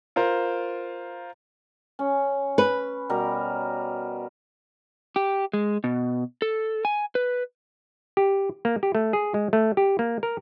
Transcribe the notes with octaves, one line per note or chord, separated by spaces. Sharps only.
F4 A#4 C5
C#4
B4
B2 G3 A#4
G4
G#3
B2
A4
G#5
B4
G4
A#3
G4
A3
G#4
G#3
A3
G4
A#3
A#4